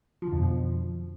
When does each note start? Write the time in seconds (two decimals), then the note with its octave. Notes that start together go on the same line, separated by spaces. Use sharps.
0.22 F3
0.27 D3
0.33 F2
0.38 B2
0.43 F3